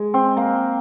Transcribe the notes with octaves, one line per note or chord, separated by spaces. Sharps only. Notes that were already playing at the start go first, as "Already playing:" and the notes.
Already playing: G#3
C4
A#3